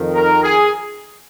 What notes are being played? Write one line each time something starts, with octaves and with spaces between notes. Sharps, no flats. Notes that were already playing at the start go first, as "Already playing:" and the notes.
Already playing: F2 D#3
A#4
G#4